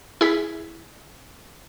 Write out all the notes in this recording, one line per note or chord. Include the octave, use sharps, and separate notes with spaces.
E4 G#4 B6